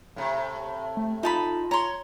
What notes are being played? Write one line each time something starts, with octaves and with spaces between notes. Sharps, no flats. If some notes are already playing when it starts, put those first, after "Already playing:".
A2 C3
A3
D#4 F4 A5 B5
C#5 A#5 C6